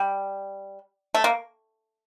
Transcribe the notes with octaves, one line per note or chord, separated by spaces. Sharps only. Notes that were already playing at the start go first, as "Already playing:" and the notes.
Already playing: G3
A3
A#3